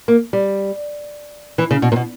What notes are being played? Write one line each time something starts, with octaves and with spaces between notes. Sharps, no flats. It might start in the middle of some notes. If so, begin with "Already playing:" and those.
A#3
G3
E3
C#3
B2
A#2
B2